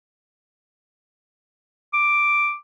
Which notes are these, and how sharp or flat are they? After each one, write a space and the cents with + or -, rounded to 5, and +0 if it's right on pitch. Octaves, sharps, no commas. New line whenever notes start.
D6 +5